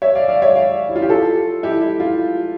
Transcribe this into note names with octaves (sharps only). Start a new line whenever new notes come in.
C#5 E5
D5 F5
D5 F5
C#5 E5
D5 F5
E4
F4
G4
F4 A4
E4 G4
E4
F4